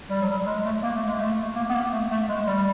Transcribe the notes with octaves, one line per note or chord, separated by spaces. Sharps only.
G3
F#3
G3
G#3
A3
A#3
A3
G#3
A#3
A3
A#3
B3
A#3
A3
A3
G#3
G3
G3